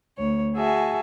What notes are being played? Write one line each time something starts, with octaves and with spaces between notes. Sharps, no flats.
D2 C#5
F#4 G#4 E5 G#5 A5